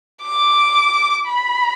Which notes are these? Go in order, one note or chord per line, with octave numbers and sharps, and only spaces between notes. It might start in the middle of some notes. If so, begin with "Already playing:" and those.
D6
B5